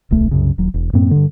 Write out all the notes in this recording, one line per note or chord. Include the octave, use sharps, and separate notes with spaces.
D1 B1 A3
C2 F#2 C#3
D#1 F#3
E1
F#2 A2 A#3 C4
G2 D3